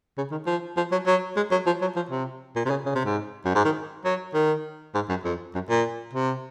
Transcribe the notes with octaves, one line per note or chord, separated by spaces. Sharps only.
C#3
D#3
F3
F3
F#3
F#3
G#3
F#3
F3
F#3
F3
C3
A#2
C3
C#3
C#3
C3
G#2
F#2
G#2
D#3
F#3
D#3
G#2
F#2
F2
F#2
A#2
C3